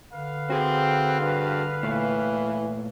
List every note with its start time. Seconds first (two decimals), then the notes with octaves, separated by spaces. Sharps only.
0.13 D3 B4 F5
0.50 C4 F#4 G#4
1.21 G2
1.83 A#2 E3 A3